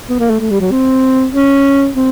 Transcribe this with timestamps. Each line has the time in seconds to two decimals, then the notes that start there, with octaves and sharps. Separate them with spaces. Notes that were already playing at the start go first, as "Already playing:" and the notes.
0.09 B3
0.19 A#3
0.30 A3
0.40 A3
0.50 G3
0.61 F#3
0.71 C4
1.33 C#4
1.95 C4